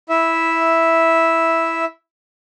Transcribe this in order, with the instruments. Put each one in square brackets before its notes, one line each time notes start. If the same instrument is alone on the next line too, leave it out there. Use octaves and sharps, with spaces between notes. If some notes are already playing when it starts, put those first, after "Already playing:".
[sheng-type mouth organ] E4 E5